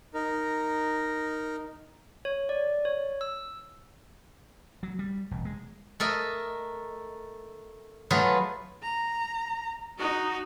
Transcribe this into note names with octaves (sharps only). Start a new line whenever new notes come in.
D#4 A#4
C#5
D5
C#5
E6
F#3
G3
E1
G#3
A3 A4 A#4 D#5
F#3 A3 F4 G#4 B4
A#5
D#4 F#4